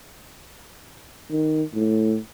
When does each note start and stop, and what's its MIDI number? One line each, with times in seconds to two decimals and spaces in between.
1.31 1.63 51
1.74 2.17 45